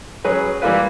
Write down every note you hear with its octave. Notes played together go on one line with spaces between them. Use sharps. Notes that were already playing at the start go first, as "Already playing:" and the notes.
F#3 C#4 G#4 B4
E3 G3 A#3 F4 B4